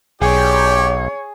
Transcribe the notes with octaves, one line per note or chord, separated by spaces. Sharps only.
B1 G4 G#4 C#5 D5 G5